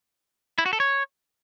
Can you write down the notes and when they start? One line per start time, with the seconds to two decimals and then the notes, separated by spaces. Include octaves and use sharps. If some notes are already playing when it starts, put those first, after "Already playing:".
0.58 E4
0.66 F#4
0.73 A4
0.80 C#5